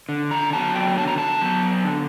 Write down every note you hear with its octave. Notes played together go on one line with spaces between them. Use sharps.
D3
A#5
F#3 B3 A5
G5
D3 A5
A#5
A5
F#3 B3
D3